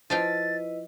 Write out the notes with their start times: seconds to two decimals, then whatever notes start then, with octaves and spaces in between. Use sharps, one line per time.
0.10 F3 E4 B4 D#5 F5 G5 A6